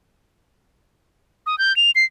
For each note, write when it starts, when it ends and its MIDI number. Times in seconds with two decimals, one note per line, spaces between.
1.46 1.58 87
1.58 1.75 91
1.77 1.91 101
1.95 2.05 96